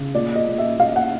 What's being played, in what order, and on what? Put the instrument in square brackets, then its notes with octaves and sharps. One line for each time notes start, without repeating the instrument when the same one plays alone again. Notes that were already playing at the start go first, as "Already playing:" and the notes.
Already playing: [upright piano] C#3
A#2 D5
D#5
A#2
E5
A#2 F5
F#5